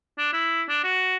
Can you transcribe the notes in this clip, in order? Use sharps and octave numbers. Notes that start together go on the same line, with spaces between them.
D4
E4
D4
F#4